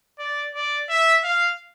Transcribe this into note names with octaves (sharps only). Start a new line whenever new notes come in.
D5
D5
E5
F5